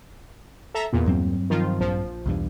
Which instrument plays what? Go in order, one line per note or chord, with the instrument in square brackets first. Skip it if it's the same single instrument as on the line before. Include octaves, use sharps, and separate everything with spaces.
[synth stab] A4 E5 A#5
E2 A#2
[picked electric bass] G2 F#3 C4
[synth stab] D#3 F3 F4
A#1 F3
[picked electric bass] B1 E2 G2